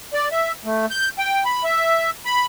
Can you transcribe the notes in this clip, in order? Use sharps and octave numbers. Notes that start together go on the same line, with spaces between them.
D5
E5
A3
G6
G5
B5
E5
B5